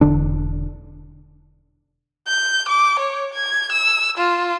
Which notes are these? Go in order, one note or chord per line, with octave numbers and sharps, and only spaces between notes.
E1 D3 D4
G6
D6
C#5
G#6
E6
F4